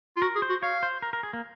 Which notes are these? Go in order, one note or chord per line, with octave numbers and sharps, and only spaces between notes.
F4
F#4 A#4
G#4
C5
F#4
C#5 F5
C5
A#4
A#4
G#4
A#3